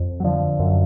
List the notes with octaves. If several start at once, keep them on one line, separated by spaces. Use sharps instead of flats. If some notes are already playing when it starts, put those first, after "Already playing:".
Already playing: F2
F#3
D3 F3
F#2